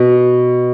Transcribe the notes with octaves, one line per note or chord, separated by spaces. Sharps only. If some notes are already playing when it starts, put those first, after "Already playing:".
Already playing: B2